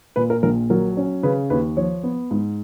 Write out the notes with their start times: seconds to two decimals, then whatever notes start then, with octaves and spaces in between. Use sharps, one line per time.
0.16 A#2 B4
0.30 A#4
0.43 A#1 A#4
0.70 F#3 A#4
0.97 C#4
1.23 C#3 B4
1.50 D#2 B4
1.77 F3 C#5
2.03 B3
2.31 G#2